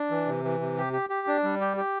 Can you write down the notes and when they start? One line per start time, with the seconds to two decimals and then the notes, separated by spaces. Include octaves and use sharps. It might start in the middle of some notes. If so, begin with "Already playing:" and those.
Already playing: D4
0.11 E3
0.26 C3
0.44 E3
0.60 C3
0.77 G4
0.93 G4
1.10 G4
1.27 D4
1.44 G3
1.61 G4
1.77 G4